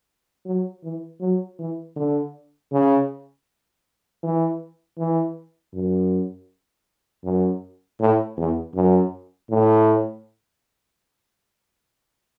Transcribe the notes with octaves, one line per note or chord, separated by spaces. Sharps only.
F#3
E3
F#3
E3
D3
C#3
E3
E3
F#2
F#2
A2
E2
F#2
A2